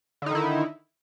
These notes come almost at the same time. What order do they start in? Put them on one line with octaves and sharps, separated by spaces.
D3 D#4 D#3 E4